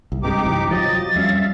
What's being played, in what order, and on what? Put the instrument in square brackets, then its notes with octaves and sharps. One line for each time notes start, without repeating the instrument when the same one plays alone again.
[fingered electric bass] C2
[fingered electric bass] G2 C3 G#3 [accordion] D#4 G4 D6
[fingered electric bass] F#2 C3 E3
[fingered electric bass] F3 F#3 [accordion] D#5 [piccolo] A6
[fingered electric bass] F2 G3 C#4 [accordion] E5 F5